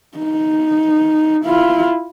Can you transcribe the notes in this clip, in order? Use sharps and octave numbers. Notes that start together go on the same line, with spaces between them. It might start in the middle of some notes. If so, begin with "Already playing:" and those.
D#4
E4 F4